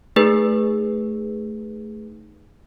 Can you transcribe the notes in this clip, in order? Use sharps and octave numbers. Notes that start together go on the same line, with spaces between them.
A3 D#4 G#4 B4